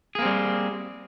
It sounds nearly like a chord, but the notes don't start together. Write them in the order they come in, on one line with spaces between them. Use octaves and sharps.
G#4 A#3 C4 G3